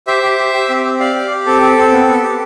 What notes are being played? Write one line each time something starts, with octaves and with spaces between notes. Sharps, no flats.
G4 C5 E5
G4
G4
G4
C4
C4
G4 D5 F5
G4
G4
C4 A4
C4
C4
B3
B3
G4